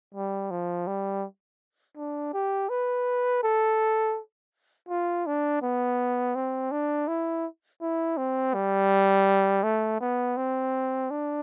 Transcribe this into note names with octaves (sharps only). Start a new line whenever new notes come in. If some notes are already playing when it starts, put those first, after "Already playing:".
G3
F3
G3
D4
G4
B4
A4
F4
D4
B3
C4
D4
E4
E4
C4
G3
A3
B3
C4
D4